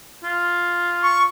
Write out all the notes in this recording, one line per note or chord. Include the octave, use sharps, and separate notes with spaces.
F4
C#6